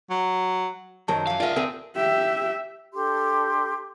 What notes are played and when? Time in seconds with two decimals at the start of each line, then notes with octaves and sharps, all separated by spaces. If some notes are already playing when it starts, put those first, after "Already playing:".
0.10 F#3
1.08 F#2 D#3 F#3 A#4 C5 A5
1.27 E3 F3 F5
1.40 F4 G#4 A#4 D5 E5 F5
1.56 C4 G#4 A#4
1.96 G4 E5
2.94 D4 G4 A4 C6